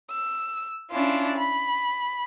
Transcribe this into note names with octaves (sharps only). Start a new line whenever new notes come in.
E6
C#4 D4 E4 F4
B5